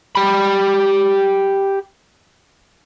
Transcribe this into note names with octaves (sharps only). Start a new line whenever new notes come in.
G4 B5